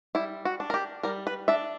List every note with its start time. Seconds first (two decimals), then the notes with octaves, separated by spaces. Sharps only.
0.15 G3 E4
0.45 F#4
0.60 D4
0.70 A#4
0.74 G4
1.03 G3 A#4
1.27 B4
1.48 D4 E5